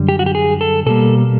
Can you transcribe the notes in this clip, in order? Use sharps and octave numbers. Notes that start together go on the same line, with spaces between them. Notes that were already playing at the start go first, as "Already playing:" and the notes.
Already playing: F#2 D3 G3
G4
F#4
G4
G#4
A4
B2 G3 A#3 A4